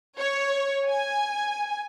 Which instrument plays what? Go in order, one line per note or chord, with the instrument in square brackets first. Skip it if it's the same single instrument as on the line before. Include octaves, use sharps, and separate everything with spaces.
[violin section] C#5
G#5